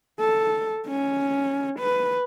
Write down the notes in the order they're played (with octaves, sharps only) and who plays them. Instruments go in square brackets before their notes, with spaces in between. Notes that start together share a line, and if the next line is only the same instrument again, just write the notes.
[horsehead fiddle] A4
C#4
B4